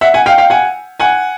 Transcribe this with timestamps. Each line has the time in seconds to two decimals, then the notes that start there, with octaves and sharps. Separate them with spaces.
0.01 E5 F#5
0.14 F#5 G#5
0.26 F5 G5
0.38 F5 G5
0.50 F#5 G#5
1.00 F#5 G#5